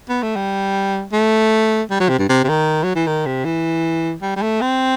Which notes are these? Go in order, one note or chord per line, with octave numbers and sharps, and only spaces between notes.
B3
A3
G3
A3
G3
F#3
C3
G2
C3
C3
D#3
F#3
E3
D#3
C3
E3
G3
G3
A3
C4